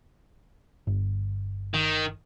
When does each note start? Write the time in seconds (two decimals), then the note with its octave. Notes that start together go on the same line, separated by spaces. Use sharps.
0.87 G1
1.74 D#3